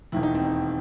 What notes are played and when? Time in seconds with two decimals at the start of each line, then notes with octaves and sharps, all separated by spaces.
0.12 E1 D#2 D#3 E4
0.23 D#4
0.34 C4
0.45 D#4